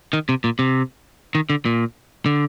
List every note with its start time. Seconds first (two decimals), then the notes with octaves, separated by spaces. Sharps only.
0.13 D#3
0.29 C3
0.44 A#2
0.59 C3
1.35 D#3
1.50 D3
1.65 A#2
2.26 D3